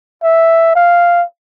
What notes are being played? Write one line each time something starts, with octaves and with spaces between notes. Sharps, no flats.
E5
F5